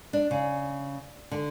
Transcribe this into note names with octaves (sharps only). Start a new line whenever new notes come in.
D4
C#3
D3